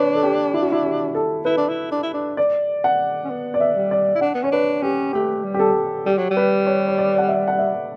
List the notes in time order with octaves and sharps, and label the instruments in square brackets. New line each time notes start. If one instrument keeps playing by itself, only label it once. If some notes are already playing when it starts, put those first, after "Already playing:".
Already playing: [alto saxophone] D4 [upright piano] B4 C#5
[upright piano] A4
G4
E4
F#4
E4
G4
A4
[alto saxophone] E4 [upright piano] B4
[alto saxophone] D4
E4
D4
E4
D4
[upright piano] D5
F#5
[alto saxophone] C#4
B3
[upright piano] D5
E5
[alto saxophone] G3
[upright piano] D5
[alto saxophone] E4
[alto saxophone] D4 [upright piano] F#5
[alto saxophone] B3
[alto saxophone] C#4 [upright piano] C#5
[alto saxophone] D4 [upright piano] B4
[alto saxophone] C#4 [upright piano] G4
[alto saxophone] A3 [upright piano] G4
[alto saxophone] G3
[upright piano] G4
A4
[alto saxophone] G3 [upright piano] G4
[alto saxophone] F#3
G3
[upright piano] B4
C#5
C#5
D5
F#5
E5
F#5
E5